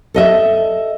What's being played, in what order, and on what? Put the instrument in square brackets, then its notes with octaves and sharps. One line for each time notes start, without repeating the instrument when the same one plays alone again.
[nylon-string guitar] A4 D#5 E5